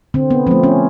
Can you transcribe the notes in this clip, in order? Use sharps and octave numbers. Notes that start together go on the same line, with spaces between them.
D3 C4
B3
F3 A3 C4
C#4